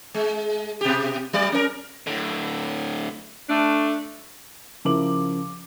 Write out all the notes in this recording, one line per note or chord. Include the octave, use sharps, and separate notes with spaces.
G#3
B2 G4
F#3 D5
C#4 A#4
A2 D3
A3 D4
C#3 F3 E4 A#4 D6 F#7